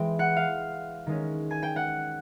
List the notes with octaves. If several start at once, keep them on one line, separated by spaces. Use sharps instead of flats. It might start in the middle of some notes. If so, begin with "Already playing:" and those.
Already playing: E3 G#3 C4 G5
F#5
F5
D#3 G#3 C#4
G#5
G5
F#5